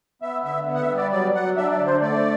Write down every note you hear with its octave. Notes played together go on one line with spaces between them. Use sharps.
B3 E5
D3 E5
B3
F#5
E5
G3
D5
F#3 D5
F#3 F#5
D4 E5
D5
D3
C5
A3 D5